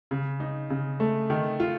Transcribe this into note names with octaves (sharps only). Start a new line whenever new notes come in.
C#3
D#4
C#3
A3
D#3
F4